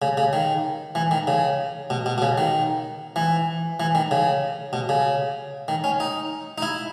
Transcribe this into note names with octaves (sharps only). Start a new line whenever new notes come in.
C#3
C#3
D#3
E3
D#3
C#3
B2
B2
B2
C#3
D#3
E3
E3
D#3
C#3
B2
C#3
D#3
C#4
D#4
D#4
E4